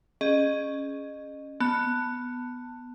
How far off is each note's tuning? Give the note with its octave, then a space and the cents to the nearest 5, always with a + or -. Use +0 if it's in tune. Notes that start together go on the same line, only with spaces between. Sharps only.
C#4 +0 G#4 +10 D#5 -25
B3 +0 A5 +20